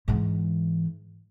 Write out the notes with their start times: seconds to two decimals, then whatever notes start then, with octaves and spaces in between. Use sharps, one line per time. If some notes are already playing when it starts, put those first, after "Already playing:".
0.08 G#2 E3